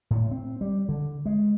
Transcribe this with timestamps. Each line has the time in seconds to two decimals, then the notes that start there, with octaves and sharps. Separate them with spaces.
0.11 A2
0.31 C4
0.61 G3
0.89 D3
1.26 G#3